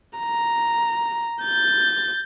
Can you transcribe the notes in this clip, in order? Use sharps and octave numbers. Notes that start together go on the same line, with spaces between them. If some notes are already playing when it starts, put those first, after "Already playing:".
A#5
G6 A6